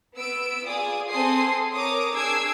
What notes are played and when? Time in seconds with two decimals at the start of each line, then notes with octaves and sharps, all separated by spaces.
0.17 B3 E6 D7
0.65 F4 G#4 D5 D#6
1.09 C4 A4 G#5 C6 D#6 C7
1.75 A#4 C#5 A#5 D6 D#6
2.14 D4 G#4 E6 G#6 C7 D7